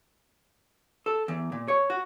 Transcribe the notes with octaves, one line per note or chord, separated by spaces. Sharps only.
A4
E2
A#2
C#5
F#4